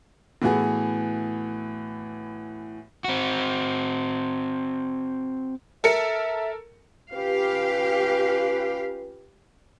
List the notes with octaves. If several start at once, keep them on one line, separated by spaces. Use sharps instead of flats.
A2 E3 B3 F#4 G#4
C4 F#4
A4 A#4 E5 C#7
C#4 F4 G4 B4 F5